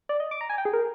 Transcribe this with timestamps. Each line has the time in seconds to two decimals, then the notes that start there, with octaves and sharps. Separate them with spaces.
0.09 D5
0.20 D#5
0.31 D6
0.41 A#5
0.49 G#5
0.58 G5
0.65 G#4
0.73 A#4